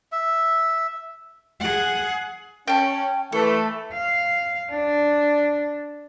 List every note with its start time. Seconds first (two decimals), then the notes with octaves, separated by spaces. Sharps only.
0.12 E5
1.60 G#4 F#5
2.68 C#4 G5 A5
3.32 E3 A3 A4
3.94 F5
4.71 D4